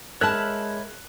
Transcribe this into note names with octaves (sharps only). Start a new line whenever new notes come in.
G#3 A#4 C#5 E5 A5 B5 F#6